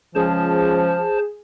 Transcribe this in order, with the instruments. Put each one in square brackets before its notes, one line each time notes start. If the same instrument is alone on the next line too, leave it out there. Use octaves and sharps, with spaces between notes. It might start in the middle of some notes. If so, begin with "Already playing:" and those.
[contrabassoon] C#2 [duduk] F3 [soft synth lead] G#4 [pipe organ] C5 A5